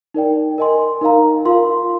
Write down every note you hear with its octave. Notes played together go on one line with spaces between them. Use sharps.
D#4 A#4 D5 G5
A#4 D#5 G#5 C6
D#4 A#4 F5 A#5
F4 A#4 F5 C6